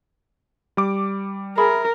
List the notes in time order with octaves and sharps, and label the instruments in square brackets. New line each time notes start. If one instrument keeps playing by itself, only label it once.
[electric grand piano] G3 D6
[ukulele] G#4 E5 B5 [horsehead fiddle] A#4